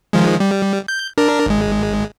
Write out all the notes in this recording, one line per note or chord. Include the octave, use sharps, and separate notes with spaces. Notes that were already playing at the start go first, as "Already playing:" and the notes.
D#3 F3 G#3
G3
G6
D4 A#4
G#1 G#3